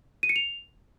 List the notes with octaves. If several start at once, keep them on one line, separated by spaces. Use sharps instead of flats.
D#7
C#7
F7